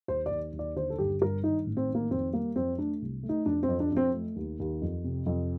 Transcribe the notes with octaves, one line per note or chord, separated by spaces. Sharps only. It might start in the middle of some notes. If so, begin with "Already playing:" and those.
D#2 C5
D5
D#2
D#2
D5
D3 C5
A4
G1 G4
G2 A#4
D#3 D#4
A1
C4
D#3
A#3
F2 C4
G3 A#3
F2 C4
A3 D4
C2
A3
D#4
F2 D4
C4
F2
D4
F2 C4
A3
D#2
D#2
F2
C3
F2